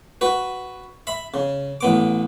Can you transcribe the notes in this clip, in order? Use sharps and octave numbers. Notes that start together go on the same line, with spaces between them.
F#4 B4
E5 B5
C#3
A1 B3 D6